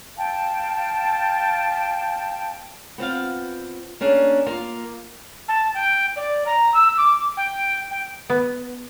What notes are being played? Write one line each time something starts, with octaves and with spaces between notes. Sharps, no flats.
F5 G5 A5
B3 C4 F4 F5
A#3 C#4 D4 G#4
A#3 F4
A5
G5
D5
A#5
E6
D6
G5
G5
B3